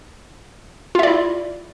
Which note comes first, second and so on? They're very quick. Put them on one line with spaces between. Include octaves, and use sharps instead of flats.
F4 E5 D5 E4